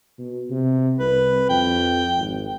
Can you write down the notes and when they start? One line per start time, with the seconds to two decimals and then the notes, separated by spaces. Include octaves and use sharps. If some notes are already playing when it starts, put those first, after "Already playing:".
0.19 B2
0.50 C3
0.99 C2 B4
1.50 F2 G5
2.17 G#1